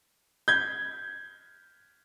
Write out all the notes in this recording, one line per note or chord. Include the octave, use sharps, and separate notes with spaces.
G6 G#6